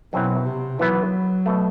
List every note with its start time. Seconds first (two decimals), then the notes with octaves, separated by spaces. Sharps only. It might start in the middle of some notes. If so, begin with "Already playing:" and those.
0.13 F#2 B2 F#3 C4 E4
0.46 C3
0.79 E3 F#3 B3 E4 B4
1.46 B2 A3